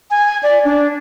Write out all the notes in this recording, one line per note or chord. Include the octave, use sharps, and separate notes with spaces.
G#5
D5
D4